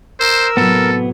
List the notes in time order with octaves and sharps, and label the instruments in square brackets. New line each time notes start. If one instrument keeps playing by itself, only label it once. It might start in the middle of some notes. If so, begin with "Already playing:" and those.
[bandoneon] A#4 E6 [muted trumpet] C5
[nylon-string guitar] A2 C3 F#3 [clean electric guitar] B3 [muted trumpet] A4